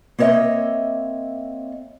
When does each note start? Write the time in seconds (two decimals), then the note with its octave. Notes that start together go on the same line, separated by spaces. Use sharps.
0.19 A#3 C4 C#5 D#5 E5